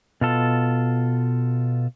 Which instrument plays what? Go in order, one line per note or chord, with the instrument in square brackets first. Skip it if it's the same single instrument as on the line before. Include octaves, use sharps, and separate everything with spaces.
[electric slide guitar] B2 F4 A4